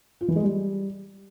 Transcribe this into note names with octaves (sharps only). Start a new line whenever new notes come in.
F4
E3
G#3
G3